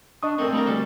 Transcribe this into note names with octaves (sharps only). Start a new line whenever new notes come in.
D4 D#5 C#6 D#6
A#2 A3 C4
G3 A3 A#3 A#4
D2 G3 A4